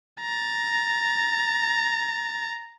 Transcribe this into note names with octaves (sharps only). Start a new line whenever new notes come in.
A#5 A6